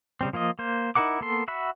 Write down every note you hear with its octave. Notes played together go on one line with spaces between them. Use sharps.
C#3 G3 C4
F3 A#3 F4 D#5
A#3 C5
D#4 E4 A#4 F#5 D6
A#3 B3 A4 C6
F#4 E5 F#5 B5